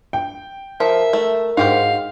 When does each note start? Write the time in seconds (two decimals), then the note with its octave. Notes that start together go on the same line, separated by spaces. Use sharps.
0.13 G5
0.80 F3 A#4 E5
1.13 A3
1.57 G#2 F#4 G4 C5 F5